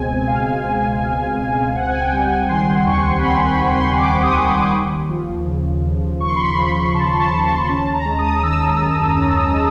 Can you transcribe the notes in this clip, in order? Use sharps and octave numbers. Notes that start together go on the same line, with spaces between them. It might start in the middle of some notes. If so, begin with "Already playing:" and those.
Already playing: C#2 B2 G#3 C4 G#5
C4 F5
G#3
B2
C#2
C4 F#5
G#5
G5
G3
G#5
D#3 C6
D#2 C#6
B5
C4 C6
B5
G3
C6
D#3 D6
D#6
D#2
D#2
F3
C#3
D#2
D#2 C#6
C6
B5
C6
F3 B5
C#3 A5
A5
D#2
A5
C#4 A5
A#5
G#3
D#6
D#3 E6
F#2
C#4
G#3